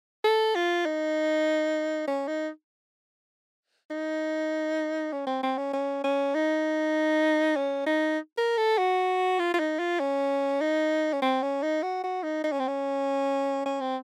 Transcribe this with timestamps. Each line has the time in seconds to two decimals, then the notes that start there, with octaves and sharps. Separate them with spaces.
0.24 A4
0.55 F4
0.85 D#4
2.07 C#4
2.27 D#4
3.90 D#4
5.12 C#4
5.27 C4
5.43 C4
5.57 C#4
5.73 C#4
6.04 C#4
6.34 D#4
7.56 C#4
7.86 D#4
8.37 A#4
8.57 A4
8.78 F#4
9.39 F4
9.54 F4
9.59 D#4
9.79 F4
10.00 C#4
10.60 D#4
11.13 C#4
11.22 C4
11.42 C#4
11.62 D#4
11.83 F#4
12.04 F#4
12.23 D#4
12.44 D#4
12.52 C#4
12.59 C4
12.68 C#4
13.65 C#4
13.80 C4